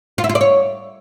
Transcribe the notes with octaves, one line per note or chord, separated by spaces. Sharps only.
F4
E4
F4
D5
C#5